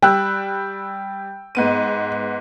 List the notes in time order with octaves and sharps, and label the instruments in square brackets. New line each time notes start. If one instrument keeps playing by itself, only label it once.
[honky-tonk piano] G3 [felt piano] G5 E6 F#6
[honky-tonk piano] G#2 B3 D#7